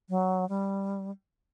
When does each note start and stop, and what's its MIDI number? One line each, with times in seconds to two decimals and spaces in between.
0.09 0.47 54
0.49 1.11 55